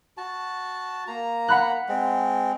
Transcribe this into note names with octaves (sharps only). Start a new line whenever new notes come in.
F#4 A5
A#3 A#5
F#5 B5 F#6
G#3 C4